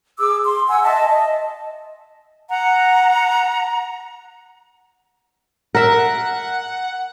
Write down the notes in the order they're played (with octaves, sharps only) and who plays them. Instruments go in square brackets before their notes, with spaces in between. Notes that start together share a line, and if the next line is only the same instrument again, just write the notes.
[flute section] G#4 D6 E6
C6
F#5 G#5 E6
D#5 E5 A5
D#5
F#5 A#5
[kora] A#4 E5 [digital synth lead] F#5